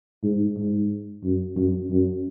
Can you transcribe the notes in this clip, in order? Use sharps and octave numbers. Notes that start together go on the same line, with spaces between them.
G#2
G#2
F#2
F#2
F#2